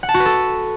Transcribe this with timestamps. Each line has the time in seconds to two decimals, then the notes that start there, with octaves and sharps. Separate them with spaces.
0.03 F#5
0.09 A5
0.14 F#4
0.20 B4
0.26 A4